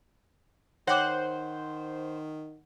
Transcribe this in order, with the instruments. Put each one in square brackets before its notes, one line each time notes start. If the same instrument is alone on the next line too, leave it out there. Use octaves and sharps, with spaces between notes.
[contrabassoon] D#3 [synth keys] C5 [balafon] C#5 G5 D6 [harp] F#5 F#6